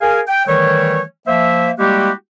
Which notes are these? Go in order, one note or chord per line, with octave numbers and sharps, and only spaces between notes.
G#4 A#4 F5 G#5
G5
D#3 E3 G3 A3 C#5
F3 A#3 C5 E5
G3 G#3 A#3 E4 F#4 G4